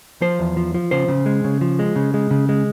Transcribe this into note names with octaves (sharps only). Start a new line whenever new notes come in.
F3 C5
E2
F3
F3
C#3 C5
C#3
G#3
C#3
F3
G#3
C#3
G#3
C#3
G#3